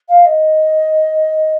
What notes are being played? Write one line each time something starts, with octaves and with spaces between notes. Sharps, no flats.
F5
D#5